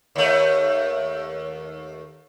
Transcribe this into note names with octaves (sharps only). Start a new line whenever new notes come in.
D#2 A3